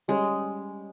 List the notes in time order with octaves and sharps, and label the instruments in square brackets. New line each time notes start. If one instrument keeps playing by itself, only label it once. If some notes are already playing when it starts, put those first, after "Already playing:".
[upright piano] G3 C#4 G4 C#5 [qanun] G#3